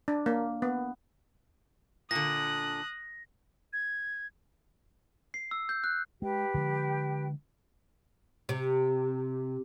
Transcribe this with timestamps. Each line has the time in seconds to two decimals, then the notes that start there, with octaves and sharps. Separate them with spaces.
0.08 D4
0.26 A#3
0.62 B3
2.11 A#2 D3 D#6 F#6 A#6
3.73 G#6
5.34 C7
5.51 E6
5.69 G6
5.84 F#6
6.22 G#3 G4 B4 G5
6.54 D3 F3 G#3
8.49 C3